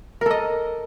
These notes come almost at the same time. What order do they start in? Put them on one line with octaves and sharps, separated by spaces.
A#4 A4 D#5